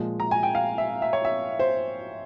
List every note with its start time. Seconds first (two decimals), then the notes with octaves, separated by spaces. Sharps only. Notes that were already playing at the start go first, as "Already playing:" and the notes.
Already playing: A#2 F3 G#3
0.20 A#5
0.31 G#5
0.43 G5
0.55 F5
0.78 E5
1.02 E5
1.13 C#5
1.25 E5
1.59 C5